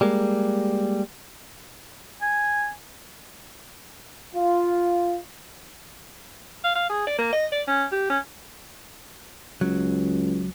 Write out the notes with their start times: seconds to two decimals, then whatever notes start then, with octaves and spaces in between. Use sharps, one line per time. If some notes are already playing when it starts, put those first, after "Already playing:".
0.01 G3 G#3 A#3
2.22 G#5
4.36 F4
6.64 F5
6.75 F5
6.90 G#4
7.07 D5
7.19 A#3
7.33 D#5
7.52 D5
7.68 C#4
7.92 G4
8.10 C#4
9.61 C#2 F#3